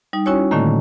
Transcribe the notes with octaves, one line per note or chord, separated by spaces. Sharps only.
G3 D#4
C#4 E4 F#4 C#5 G#5
A2 D3 D#3 A3 A#3